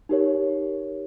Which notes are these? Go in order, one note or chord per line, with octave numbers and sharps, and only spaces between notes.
D#4 G4 A#4 C#5